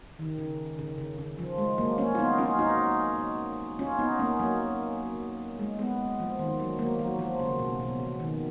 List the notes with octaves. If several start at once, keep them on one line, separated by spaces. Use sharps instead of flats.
D#3
C#3
C#3
C#3
C#3
F3
G#3
F#3 A#3
A#3 C#4
F4
B3 D#4
C#4 F4
D#4 F#4
C#4 F4
B3 D#4
A#3 C#4
F#3 A#3
G#3
G#3 B3
F3
D#3
F#3
F#3 A#3
F#3
F3
C#3
B2
B2
C#3
D#3